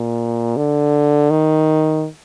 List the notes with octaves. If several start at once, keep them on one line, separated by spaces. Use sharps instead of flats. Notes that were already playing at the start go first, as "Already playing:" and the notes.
Already playing: A#2
D3
D#3